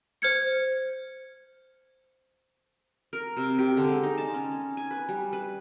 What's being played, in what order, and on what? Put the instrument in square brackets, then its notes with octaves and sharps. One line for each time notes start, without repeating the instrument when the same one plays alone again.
[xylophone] C5 F6 G#6 C#7
[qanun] A#4
C3
G4
D3
G#3
D#4
A5
C#4
G#5
B4
G3
B4